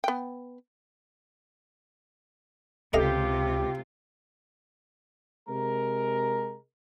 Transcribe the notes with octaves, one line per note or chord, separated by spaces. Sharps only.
B3 G5
C#2 C3 F4 G4 A4 D#5 F5
C3 G#3 A#4